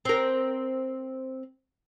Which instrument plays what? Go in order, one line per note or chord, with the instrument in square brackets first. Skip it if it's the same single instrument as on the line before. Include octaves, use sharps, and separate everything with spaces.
[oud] C4 A#4